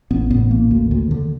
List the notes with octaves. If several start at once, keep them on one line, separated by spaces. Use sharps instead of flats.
A1 B3
A2 B3
A1 A#3
D2
D2
D3